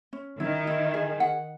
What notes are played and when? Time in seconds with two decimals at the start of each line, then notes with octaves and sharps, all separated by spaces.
0.13 C#4
0.40 D#3 E4
0.67 E4
0.94 G#4
1.20 F#5